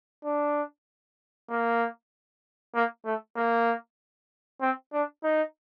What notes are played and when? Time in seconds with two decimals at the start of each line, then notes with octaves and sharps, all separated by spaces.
0.25 D4
1.50 A#3
2.75 A#3
3.05 A3
3.36 A#3
4.61 C4
4.93 D4
5.23 D#4